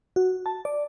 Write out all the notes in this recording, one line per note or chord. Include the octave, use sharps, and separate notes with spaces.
F#4
A5
D5